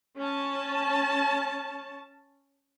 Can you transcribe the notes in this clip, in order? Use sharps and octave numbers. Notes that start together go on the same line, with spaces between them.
C#4 A5